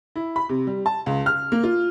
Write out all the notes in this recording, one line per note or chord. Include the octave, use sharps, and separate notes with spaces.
E4
B5
C3
G3
A5
C#2
F6
A#3
F4